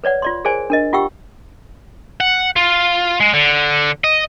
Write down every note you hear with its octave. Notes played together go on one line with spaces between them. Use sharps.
B4 C#5 D5 F#5
F4 D5 C6
G#4 A#4 C5 D5 G#5
D4 A#4 D#5
F4 G4 F#5 G5 C#6 E6
F#5
F4
G#3
D3
D#5